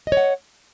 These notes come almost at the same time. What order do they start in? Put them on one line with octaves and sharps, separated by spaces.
D#5 C#5 F#5